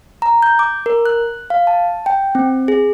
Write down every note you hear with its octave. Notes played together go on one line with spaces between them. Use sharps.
A#5
G6
D6
A#4
F#6
F5
A5
G5
C4
G#4